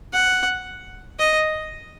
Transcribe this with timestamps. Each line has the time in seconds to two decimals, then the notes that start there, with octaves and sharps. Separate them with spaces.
0.13 F#5
1.19 D#5